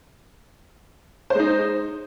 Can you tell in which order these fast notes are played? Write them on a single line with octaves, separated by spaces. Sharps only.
C5 G#3 D#4